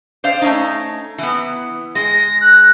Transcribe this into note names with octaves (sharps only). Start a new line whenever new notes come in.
C5 D5 F5
A3 C#4 D#4
E3 B3
G#3 A#6
F#6